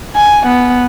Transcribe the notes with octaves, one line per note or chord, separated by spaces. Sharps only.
G#5
B3